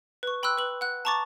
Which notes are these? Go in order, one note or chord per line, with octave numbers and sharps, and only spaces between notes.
B4 C#6
G5 B5 C6 E6 F#6
B4 F#7
F#5 F#6
A5 A#5 C#6 D6 A6